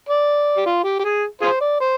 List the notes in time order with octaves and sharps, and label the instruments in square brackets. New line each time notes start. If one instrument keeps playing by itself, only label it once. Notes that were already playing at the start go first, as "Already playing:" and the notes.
[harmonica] D5
G4
F4
G4
G4
G#4
F4 G#4 C5
D5
C5